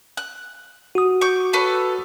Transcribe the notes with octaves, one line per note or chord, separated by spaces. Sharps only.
F#6
F#4 D#6
C#6 D6 G6
A4 B4 C#5